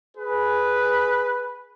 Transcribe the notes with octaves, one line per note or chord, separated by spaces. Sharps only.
G#4 B4